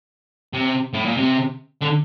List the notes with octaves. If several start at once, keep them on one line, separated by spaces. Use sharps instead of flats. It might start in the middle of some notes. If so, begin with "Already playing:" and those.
C3
A2
A#2
C3
D3